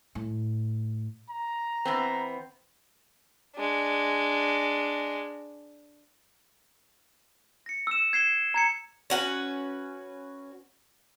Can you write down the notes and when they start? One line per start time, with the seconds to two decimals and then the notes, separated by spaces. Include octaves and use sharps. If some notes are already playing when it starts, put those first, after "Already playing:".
0.15 A2
1.30 A#5
1.85 E2 B3 C4
3.56 G#3 D4
7.66 A#6 C#7
7.87 E6 E7
8.13 G#6 C7 E7 G7
8.54 A#5 G#6 C#7
9.10 C#4 F#4 B4